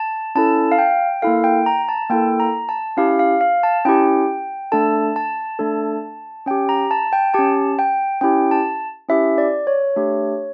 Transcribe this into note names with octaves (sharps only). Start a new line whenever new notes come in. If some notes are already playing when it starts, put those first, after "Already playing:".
Already playing: A5
C#4 E4 A4 A5
F5
G5
A#3 E4 A4 F5
G5
A#5
A5
A#3 E4 A4 G5
A#5
A5
C#4 E4 G4 F5
F5
F5
A5
C#4 E4 G4 G5
A3 D4 A4 A5
A5
A3 D4 A4
C#4 G4 G5
A#5
A5
G5
C#4 G4 A5
G5
C#4 E4 G4 G5
A5
C#4 E4 G4 E5
D5
C#5
A3 D4 G4